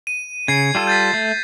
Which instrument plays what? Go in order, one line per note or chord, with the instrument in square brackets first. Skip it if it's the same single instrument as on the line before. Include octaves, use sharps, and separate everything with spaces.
[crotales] D#7
[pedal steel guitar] C#3 [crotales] G#6 C7
[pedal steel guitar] G3 F4 A4
[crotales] G6 A6 B6
[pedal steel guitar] A3